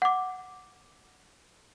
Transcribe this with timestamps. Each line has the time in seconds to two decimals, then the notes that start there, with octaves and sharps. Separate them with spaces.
0.02 F#5 D6